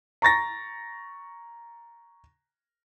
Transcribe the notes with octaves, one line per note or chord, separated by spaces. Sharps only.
A#5 C#6 A6 A#6